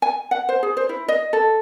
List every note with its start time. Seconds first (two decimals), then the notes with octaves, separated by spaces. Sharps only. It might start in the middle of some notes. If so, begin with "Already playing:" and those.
0.02 G#5
0.31 F#5
0.49 C5
0.63 G#4
0.77 C5
0.89 E4
1.08 D#5
1.33 A4